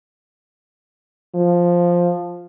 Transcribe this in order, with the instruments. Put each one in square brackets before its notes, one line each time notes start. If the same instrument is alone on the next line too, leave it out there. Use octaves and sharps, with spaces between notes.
[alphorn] F3